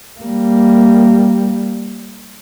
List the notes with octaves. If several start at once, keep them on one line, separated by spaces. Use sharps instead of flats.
G3 A#3